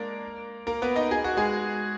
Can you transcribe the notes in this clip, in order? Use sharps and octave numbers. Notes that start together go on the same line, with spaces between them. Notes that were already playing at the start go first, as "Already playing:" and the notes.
Already playing: G#3 A#3 D4 A#4
A#3 A#4
B3 B4
D#4 D#5
G#4
F#4
G#3 G#4